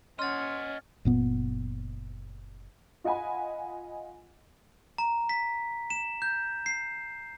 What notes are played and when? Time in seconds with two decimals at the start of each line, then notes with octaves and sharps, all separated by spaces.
0.19 C#4 D#5 F#5 C6 F6 A6
1.05 F#1 A#2 B3
3.04 F4 D#5 F#5 G#5 B5
4.98 A#5
5.29 B6
5.90 E7
6.22 G6
6.66 C7